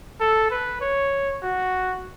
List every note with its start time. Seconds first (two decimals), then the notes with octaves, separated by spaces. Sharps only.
0.20 A4
0.51 B4
0.81 C#5
1.43 F#4